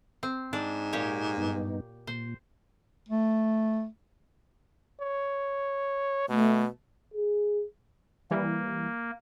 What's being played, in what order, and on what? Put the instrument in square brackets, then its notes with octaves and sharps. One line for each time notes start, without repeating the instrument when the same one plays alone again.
[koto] C4
[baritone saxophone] G#2 [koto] D4
[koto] A#2 G4 C#5
[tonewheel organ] G2 B3 D#4
[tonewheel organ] A#2 [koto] C5
[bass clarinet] A3
[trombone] C#5
[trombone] B2 [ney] A3
[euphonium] G#4
[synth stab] E3 G3 [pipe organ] A#3